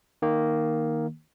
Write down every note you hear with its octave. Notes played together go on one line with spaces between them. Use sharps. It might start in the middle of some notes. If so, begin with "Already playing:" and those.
D#3 A#3